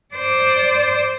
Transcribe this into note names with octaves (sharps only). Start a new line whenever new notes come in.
C5 D5